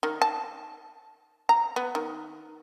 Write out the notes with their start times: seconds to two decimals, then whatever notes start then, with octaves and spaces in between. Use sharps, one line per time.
0.03 D#3
0.22 A5
1.49 A#5
1.76 B3
1.95 D#3